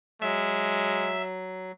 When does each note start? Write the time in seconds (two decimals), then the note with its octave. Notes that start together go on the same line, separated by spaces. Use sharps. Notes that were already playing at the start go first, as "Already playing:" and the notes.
0.22 F#3 G#3 E5